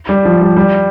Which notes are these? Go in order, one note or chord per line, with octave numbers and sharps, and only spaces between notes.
G3
F3
G3
G3